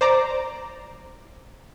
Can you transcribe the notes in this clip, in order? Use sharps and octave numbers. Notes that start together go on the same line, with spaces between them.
C5 D5 A#5 D6